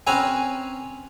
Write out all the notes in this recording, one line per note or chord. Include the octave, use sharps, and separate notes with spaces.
C4 C#4 B4 G#5 A#5